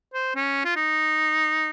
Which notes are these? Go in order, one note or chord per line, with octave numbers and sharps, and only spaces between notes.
C5
C#4
F4
D#4